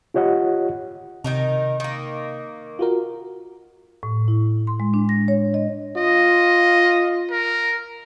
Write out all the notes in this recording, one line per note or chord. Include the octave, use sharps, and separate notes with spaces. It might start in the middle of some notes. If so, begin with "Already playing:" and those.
F4 G4 C#5 D#5 F#5
C3 D#3 D#4 A#4
D#3 A#3
F4 F#4 A#4
A2
E4
C6
G#3
D4
A#6
C#5
D#5
F4 D#5
A#4